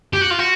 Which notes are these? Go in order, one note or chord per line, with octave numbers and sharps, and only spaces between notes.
G4
F#4
F4
F#4